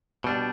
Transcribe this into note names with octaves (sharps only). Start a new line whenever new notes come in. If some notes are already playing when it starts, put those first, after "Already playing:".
B2 G3 D4